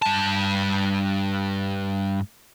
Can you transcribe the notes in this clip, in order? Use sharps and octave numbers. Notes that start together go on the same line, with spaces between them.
G2 A5